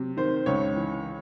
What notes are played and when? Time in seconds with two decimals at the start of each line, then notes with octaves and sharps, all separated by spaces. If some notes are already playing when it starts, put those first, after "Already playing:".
Already playing: C3 F#3
0.17 D#3 C5
0.46 C#2 C#5
0.76 E3